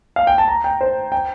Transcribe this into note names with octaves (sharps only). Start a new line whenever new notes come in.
F5
G5
A5
A#5
G5
C5
G5